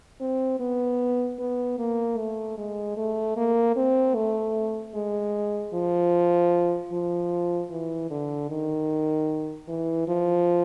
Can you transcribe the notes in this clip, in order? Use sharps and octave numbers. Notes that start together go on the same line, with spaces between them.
C4
B3
B3
A#3
A3
G#3
A3
A#3
C4
A3
G#3
F3
F3
E3
D3
D#3
E3
F3